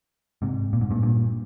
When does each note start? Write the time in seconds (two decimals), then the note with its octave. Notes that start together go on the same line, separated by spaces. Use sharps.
0.42 G#2 C3
0.73 A#2
0.81 G#2
0.91 G2 A#2
1.03 G2 A#2